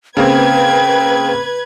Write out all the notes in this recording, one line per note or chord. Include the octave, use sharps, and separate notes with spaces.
C#3 A#3 C4 B4 G5 G#6